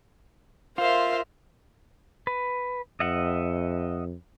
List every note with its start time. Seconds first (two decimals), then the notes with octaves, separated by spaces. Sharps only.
0.78 F4 A#4 C5 E5 F5
2.27 B4
3.00 F2 D#5 E5 F#5